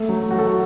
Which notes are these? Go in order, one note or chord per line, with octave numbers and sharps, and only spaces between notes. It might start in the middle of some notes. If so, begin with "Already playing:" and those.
Already playing: A3
F#3
F#3 F#4
A4
F#4